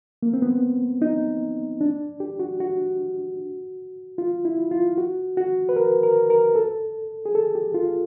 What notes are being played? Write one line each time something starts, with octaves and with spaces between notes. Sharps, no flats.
A#3
C4
B3
D#4
D4
G4
F#4
F#4
F4
E4
F4
F#4
F#4
B4
A#4
A#4
A#4
A4
G#4
A4
G4
F4